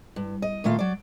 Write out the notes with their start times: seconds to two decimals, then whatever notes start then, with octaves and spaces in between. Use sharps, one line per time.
0.16 G2
0.42 D#5
0.64 A#2 D#3 A3 F4 F5
0.79 F#3 D5